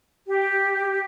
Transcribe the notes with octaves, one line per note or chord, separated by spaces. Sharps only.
G4